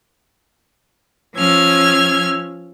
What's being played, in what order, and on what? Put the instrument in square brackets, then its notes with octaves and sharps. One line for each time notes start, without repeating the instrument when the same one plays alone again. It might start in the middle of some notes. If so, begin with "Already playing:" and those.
[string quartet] F3 C#4 E6 F6 G#6